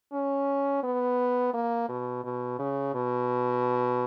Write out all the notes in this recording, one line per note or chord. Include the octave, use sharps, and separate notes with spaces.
C#4
B3
A#3
B2
B2
C#3
B2